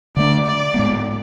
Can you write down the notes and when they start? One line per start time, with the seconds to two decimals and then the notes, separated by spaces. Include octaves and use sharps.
0.16 D3 A3 D4 D5
0.45 D5
0.74 G#2 G#3 B3